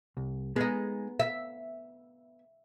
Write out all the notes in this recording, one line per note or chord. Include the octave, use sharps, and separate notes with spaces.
C2
G#3 B3 D#4
E5